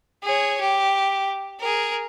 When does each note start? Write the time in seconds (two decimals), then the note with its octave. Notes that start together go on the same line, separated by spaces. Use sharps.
0.24 G#4 C#5
0.60 G4
1.60 G#4 A#4